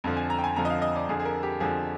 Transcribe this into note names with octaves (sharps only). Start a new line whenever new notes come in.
F2 D3 F3
G#5
A#5
G5
G#5
F2 D3 F3 A#5
D#5
F5
D#5
D5
F2 D3 F3 G#4
G#4
A#4
G4
F2 D3 F3 G#4